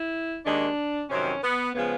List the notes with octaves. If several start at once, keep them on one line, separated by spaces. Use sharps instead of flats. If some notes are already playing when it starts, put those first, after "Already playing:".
Already playing: E4
D#2 D#3 G#3 D4
F2 C3 D#3 F#3 C#4
B3
C#3 F3 G#3 B3